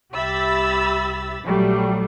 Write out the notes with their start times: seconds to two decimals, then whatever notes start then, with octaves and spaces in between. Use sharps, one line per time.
0.13 C2 G4 E5 B5 E6 A6
1.44 A#1 F#3 G3 A3